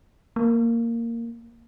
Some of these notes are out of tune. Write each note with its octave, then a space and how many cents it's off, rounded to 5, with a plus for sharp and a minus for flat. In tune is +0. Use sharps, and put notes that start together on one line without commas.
A#3 -10